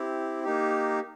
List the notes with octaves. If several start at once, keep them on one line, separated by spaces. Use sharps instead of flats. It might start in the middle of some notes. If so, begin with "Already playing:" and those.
Already playing: C4 E4 G4
A#3 D#4 G4